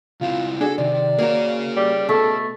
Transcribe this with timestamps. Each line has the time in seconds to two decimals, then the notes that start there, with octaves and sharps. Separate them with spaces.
0.21 C#3 C4 E4 F4
0.61 D4 F#4 G#4 A4
0.78 C3 D#3 D5
1.18 A#3 F#4 G#4 A#4 C#5
1.76 G3
2.09 B2 A3 A4